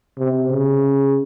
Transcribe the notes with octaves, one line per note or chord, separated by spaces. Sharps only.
C3
C#3